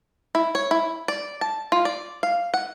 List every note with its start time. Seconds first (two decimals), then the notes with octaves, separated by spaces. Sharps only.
0.35 E4
0.55 C#5
0.71 E4
1.08 D5
1.41 A5
1.72 F4
1.85 D5
2.23 F5
2.54 F#5